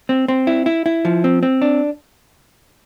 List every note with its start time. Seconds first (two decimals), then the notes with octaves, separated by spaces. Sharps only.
0.09 C4
0.28 C4
0.47 E4
0.66 E4
0.86 E4
1.05 F3
1.24 C4
1.43 C4
1.62 D4